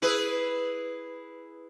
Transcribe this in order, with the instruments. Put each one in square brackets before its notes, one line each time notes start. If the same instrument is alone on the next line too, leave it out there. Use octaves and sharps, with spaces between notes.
[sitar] E4 G#4 B4